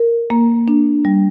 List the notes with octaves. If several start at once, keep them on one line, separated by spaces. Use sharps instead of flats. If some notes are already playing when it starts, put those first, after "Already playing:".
Already playing: A#4
A#3
D4
G3